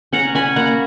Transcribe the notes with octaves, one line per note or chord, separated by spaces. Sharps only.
C#4 F#5 A#5
C#4 G#5 B5
A#3 F#5 A#5